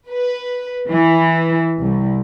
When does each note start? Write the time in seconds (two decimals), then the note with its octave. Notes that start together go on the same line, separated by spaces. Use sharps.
0.10 B4
0.92 E3
1.79 C2